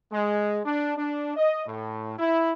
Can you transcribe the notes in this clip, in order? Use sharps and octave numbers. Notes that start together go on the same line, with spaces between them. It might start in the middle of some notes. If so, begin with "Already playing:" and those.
G#3
D4
D4
D#5
A2
E4